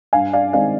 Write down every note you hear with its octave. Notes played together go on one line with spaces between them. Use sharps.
G2 F5 G#5
D5 F5
D#3 G#3 C4 D5 F5